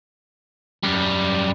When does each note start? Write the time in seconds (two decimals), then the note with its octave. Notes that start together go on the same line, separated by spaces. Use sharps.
0.83 F#2 G3